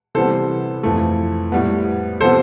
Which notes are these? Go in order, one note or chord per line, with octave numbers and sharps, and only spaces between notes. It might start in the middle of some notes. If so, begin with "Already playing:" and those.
C3 E3 G3 B3 A4 C5
F2 E3 A3
A2 G3 B3
C3 F3 B3 A4 C5